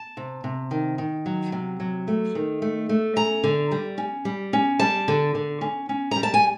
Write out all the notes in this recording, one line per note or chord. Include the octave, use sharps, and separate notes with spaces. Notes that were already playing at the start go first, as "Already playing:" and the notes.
Already playing: A5
C3
C3
D#3
D#3
F#3
C3
F#3
A3
D#3
A3
A3
C#4 A#5
D3
G3
C#4
G3
C#4
G3 A5
D3
D3
C#4
C#4
G3 A#5
A5
G#5